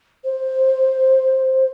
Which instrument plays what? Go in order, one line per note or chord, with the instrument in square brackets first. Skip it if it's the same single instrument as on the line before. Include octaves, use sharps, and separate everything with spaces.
[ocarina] C5